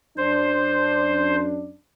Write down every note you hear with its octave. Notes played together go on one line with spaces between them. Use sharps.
F#2 D4 C5